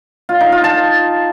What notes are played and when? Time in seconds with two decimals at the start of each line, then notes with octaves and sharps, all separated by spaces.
0.29 F4
0.41 D#4
0.52 F4
0.64 A5